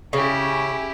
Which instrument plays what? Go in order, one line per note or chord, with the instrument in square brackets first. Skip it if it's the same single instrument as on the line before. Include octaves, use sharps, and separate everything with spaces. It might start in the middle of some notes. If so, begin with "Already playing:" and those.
[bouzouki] C#3 [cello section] C#4 [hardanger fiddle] E4 G4